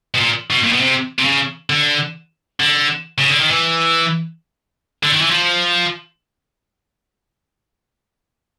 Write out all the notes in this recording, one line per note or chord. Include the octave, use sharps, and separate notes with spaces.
B2
A#2
B2
A#2
B2
C3
C3
C#3
D3
D3
C#3
D3
D#3
E3
D3
D#3
E3
F3